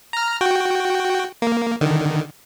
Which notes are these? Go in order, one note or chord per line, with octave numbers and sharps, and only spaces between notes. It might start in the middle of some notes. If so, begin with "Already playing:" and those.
A#5 F6
F#4 G5
A#3
D3 D#3